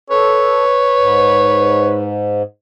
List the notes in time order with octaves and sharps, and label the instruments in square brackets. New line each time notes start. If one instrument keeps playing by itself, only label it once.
[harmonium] A4 [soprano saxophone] B4 [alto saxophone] C#5
[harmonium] G#2